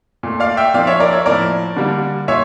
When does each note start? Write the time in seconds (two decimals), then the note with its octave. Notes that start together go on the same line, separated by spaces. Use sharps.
0.23 A#2 A3
0.40 D5 F5
0.57 E5 G5
0.74 A#2 F3 A#3 D5 F5
0.87 C#5 E5
1.00 A#4 D5
1.12 C#5 E5
1.26 A2 F3 A#3 A#4 D5
1.76 D3 G3 A#3
2.28 A#2 C#5 E5